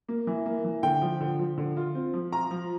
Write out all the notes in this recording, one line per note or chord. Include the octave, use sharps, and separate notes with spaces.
A#3
E3
A#3
E3
D3 G5
F3
D3
F3
D3
F4
C4
F3
F4 A#5
F3